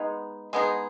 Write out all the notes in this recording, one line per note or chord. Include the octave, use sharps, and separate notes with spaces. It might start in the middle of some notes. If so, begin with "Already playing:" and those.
Already playing: G#3 B3 D#4
G#3 B3 D#4 G#4